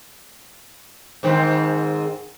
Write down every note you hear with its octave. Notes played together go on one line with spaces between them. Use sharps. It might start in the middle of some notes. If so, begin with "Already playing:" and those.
G#2 D#3 C4